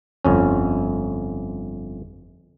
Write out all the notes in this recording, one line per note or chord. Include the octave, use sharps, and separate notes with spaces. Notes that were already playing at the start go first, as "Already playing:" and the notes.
G1 F2 C#4